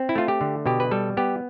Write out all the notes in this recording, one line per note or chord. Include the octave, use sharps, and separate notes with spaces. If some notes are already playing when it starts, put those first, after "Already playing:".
Already playing: C4
E4
A3 F4
G4
D3
B2 G4
B4
G3 A4
B3 G4